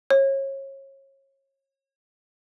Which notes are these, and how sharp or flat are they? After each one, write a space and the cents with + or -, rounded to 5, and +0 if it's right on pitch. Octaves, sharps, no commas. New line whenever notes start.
C#5 -30